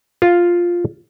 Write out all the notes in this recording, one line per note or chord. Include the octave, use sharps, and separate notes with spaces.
F4